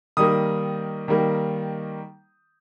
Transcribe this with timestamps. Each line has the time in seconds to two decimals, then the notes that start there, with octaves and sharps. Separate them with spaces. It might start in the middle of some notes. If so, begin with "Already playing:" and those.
0.17 D#3 G3 A#3 D#6
1.08 D#3 G3 A#3